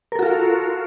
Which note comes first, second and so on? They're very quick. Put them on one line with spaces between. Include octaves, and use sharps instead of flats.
A#4 A4 F#4 F4